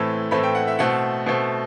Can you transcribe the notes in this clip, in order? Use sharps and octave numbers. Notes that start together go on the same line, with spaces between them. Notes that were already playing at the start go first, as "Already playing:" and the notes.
Already playing: A2 E3 A3 C4 B5
A2 E3 A3 C4 B5
G5
F#5
E5
B2 A3 C4 F#5
B2 A3 C4